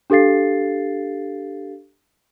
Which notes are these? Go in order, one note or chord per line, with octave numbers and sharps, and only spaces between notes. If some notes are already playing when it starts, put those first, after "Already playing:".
D4 G4 A4 F5 A6 C7